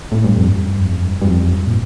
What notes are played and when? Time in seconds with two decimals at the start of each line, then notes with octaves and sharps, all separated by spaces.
0.12 A2
0.24 G2
0.37 F2
0.49 G2
0.81 F2
1.05 G2
1.22 G2
1.27 F2
1.51 G2
1.67 A#2